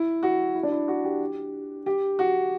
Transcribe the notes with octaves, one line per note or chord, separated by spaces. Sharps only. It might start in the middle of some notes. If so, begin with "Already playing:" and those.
Already playing: E4
F#4
E4
D4
E4
F#4
G4
G4
F#4